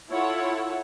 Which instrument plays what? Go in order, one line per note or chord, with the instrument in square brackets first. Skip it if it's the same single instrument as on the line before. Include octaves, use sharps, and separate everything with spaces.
[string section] E4 F4 A4 C#5 F#5